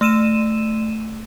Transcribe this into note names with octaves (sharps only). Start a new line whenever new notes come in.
A3 E6 D#7 E7